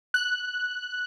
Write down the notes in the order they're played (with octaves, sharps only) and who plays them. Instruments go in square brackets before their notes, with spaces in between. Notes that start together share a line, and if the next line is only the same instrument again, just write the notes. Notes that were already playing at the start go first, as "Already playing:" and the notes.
[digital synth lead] F#6